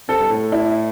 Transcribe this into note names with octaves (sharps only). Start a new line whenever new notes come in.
C3 A4
G2
A2
E4